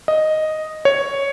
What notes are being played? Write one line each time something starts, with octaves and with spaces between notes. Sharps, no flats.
D#5
C#5